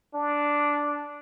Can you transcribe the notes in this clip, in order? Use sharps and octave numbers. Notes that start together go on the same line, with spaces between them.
D4